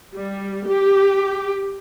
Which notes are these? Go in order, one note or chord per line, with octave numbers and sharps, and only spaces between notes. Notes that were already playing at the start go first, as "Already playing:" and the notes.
G3
G4